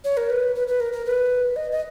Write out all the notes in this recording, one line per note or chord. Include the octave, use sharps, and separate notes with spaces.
C#5
A#4
B4
B4
B4
A#4
A#4
B4
D#5
D#5